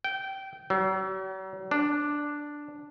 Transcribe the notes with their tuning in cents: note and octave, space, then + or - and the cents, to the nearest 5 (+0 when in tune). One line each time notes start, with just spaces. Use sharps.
G5 -20
F#3 +45
D4 +0